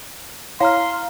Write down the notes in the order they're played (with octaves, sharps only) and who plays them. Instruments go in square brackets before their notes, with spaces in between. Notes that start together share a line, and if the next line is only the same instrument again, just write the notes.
[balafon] E4 C#5 [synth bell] F5 A#5 F6 [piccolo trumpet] C6